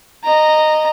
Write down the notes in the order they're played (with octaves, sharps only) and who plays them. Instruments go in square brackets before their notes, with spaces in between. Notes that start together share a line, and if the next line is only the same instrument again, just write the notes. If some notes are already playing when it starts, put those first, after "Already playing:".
[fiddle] D#5 A#5